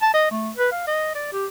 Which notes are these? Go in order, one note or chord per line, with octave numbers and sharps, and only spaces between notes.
A5
D#5
A3
B4
F5
D#5
D5
G4